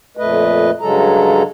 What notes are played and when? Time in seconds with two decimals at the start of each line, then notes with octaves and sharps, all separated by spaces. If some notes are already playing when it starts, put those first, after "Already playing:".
0.17 F2 A#2 A3 B4 D#5
0.81 G2 C#3 F#3 G#3 A4 A#5